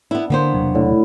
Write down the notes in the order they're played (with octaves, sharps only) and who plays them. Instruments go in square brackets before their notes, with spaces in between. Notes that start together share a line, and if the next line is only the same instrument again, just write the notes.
[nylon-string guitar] B3 E4 [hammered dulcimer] D4
[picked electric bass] D3 [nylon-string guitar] A#3 B3 C5
[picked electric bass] E1 C3 F#3
[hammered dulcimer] A2 D3